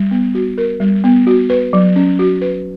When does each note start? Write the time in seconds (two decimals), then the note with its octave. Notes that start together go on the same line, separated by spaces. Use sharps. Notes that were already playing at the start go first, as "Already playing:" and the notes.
Already playing: G3
0.11 B3
0.35 F#4
0.58 A#4
0.80 G3
1.04 B3
1.27 F#4
1.50 B4
1.73 F#3
1.96 C#4
2.19 F#4
2.41 B4